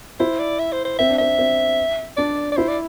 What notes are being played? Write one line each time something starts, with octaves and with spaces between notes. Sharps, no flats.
E4 C5
D5
E5
C5
C5
C4 E5
D4
C4 E5
C4
D4 D5
D5
E4 C5
D5